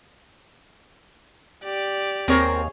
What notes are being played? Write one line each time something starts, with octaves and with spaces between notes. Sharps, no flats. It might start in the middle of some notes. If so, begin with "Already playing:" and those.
G4 D5
D#2 C4 G#4 A#4 C5 C#5